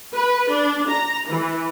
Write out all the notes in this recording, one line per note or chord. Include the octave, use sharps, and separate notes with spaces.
B4
D4
A#5
E3